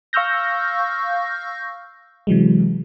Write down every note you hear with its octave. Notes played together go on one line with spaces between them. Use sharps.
F5 C#6 E6 F6 G6 A#6
C3 E3 F#3 G#3